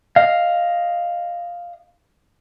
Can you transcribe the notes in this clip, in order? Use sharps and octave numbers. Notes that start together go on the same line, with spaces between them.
D#5 F5